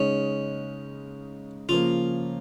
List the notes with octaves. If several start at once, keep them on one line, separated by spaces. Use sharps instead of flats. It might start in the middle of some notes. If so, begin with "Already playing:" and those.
Already playing: C#3 G#3 C#4 D#4
C#3 F3 A#3 F4